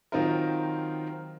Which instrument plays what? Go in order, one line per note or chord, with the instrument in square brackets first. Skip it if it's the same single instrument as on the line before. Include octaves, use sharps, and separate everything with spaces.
[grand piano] D#3 F#3 C4 D#4 F4 A#4